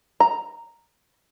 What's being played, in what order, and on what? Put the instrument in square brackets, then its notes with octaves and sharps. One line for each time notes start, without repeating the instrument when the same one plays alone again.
[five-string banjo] A#5